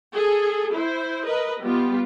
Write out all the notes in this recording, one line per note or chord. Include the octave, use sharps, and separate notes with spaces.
G#4 A4
E4 C5
A#4 B4 D#5
G3 B3 F4 G4